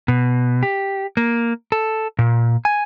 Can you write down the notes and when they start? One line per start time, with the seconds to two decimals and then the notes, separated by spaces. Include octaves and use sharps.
0.08 B2
0.63 G4
1.17 A#3
1.72 A4
2.19 A#2
2.65 G#5